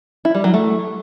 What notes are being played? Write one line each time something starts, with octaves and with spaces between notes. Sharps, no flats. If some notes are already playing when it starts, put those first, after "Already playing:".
E4
G3
F#3
A3